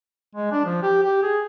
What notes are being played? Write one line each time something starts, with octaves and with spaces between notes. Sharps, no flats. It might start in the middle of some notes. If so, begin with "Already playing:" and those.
G#3
D4
F3
G4
G4
G#4